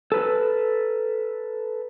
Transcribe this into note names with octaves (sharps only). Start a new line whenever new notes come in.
A4 B4